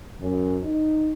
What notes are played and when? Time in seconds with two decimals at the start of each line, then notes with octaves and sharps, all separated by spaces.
0.21 F#2
0.63 D#4